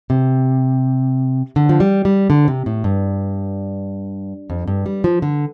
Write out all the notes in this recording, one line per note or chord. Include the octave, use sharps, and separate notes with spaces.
C3
D3
F3
G3
G3
D3
C3
A2
G2
F2
G2
G3
F3
D3